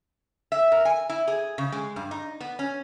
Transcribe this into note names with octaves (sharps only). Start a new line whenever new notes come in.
E5
A#4
G#5
E4
G#4
C#3
G#3
G2
D#4
B3
C#4